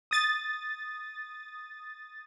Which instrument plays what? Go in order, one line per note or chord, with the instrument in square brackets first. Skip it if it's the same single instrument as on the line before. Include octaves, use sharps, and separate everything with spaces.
[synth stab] D#6 A6